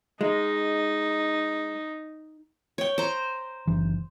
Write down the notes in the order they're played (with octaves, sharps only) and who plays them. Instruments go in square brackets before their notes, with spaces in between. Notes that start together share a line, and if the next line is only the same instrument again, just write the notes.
[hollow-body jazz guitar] G#3 [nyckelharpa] D#4
[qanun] C#5 G5
C5 A#5
[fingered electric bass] F#1 E3